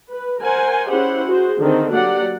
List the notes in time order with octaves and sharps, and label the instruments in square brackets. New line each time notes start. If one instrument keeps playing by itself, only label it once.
[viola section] B4
A#4 C5 F#5 G#5
C#4 E4 G4 G#4 C5 F#5
F#4 G#4 C5
D3 D#3 C4
F#3 A#3 G4 D5 F#5